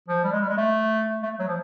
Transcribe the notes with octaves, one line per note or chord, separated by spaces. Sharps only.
F3
G3
G#3
G3
G#3
A3
A3
F#3
F3